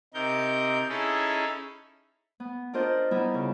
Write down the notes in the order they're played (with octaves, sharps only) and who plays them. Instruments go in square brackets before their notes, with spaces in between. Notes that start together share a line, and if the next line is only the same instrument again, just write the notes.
[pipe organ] C3 D#4 A#4 G6
C#4 D#4 E4 G#4 A4
[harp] B3
D4 F4 A#4 C5 D#5
G3 B3 D#4 E4
C#3